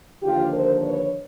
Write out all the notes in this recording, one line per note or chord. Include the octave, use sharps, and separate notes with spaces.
D#2 D3 F3 F4 G4
A#4 C5
B4 C#5